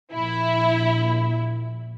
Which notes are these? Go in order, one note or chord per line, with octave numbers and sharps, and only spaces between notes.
A#1 E4